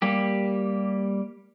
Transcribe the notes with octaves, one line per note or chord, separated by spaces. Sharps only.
G3 A#3 G4